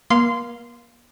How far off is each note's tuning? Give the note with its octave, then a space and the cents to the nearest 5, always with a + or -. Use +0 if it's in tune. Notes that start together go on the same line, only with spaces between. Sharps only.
A#3 +40 F5 +0 C6 -15